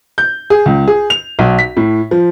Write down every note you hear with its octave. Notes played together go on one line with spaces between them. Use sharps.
G6
G#4
C#2
G#4
F7
B1
B6
A2
F3